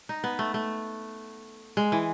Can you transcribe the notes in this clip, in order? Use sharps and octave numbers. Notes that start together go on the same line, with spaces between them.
D#4
B3
A3
A3
G#3
E3